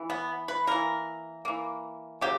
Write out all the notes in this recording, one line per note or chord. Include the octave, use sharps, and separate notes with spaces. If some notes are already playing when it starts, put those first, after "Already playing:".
Already playing: E3
B3
B4
E3 A#3 A#4
E3 A#3
C#3 F#3 A#3 G4